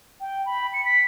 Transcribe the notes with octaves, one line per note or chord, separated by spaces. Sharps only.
G5
B5
C#7
B6